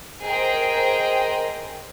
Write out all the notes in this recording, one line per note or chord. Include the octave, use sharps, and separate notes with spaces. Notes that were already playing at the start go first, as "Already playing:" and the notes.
G#4 A#4 C5 D#5 G5 A#5